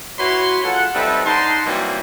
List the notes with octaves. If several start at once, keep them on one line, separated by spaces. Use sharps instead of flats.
E4 F#4 B4 C#5 B5 C6
G#3 F4 A4 F#5
G3 C4 D#4 A4 B4 E5
D4 D#4 F#5 A5 C6
E3 F#3 G3 A#3 C4 D#4